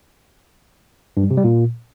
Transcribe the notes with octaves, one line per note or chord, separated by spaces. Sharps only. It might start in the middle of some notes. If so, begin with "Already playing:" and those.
G2
G3
C3
G3
A#2